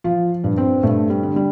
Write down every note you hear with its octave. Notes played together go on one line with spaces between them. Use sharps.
F3 F4
G2
C4
G2 A3
G3
D3
G3